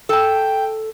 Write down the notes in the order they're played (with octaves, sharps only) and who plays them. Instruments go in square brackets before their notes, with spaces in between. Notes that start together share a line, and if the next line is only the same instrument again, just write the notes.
[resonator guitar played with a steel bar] A4 A5 [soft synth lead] G5